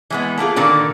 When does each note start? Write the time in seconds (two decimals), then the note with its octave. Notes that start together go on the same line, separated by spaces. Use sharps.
0.10 E3 G#3 B3
0.38 A3 A#3 F4 G#4
0.56 A#2 D3 D#3 A#3